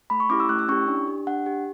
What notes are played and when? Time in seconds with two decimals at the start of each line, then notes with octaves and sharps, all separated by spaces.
0.10 A3 B5
0.20 C#6
0.29 C#4 E4 G4 D6
0.40 E6
0.49 A3 F#6
0.59 E6
0.68 C#4 E4 G4 C#6
0.87 D4
1.08 G4
1.27 D4 F#5
1.46 G4